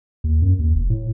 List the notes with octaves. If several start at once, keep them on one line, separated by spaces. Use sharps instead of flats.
D#2
F#2
D#2
F1
A2